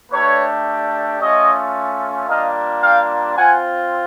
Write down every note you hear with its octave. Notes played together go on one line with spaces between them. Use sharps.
A3 D4 G4 B4 C#5
A3 C#4 F4 C#5 D#5
G3 A#3 D4 F4 D#5 F5
F5 G5
C4 F4 F#5 G#5